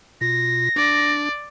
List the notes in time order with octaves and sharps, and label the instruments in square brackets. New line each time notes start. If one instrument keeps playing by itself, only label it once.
[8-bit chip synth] B2 F4 [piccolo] A#6
[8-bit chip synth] D4 [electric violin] D5